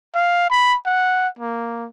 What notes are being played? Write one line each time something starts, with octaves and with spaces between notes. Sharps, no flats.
F5
B5
F#5
A#3